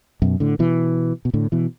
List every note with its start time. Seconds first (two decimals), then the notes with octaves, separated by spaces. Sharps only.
0.22 F#2 B2
0.40 A2 D3
0.59 B2 E3
1.25 B2
1.34 A2 D3
1.52 B2 E3